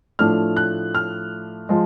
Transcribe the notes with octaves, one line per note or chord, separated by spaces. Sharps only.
A2 F3 A3 D4 F6
F#6
F6
F3 G#3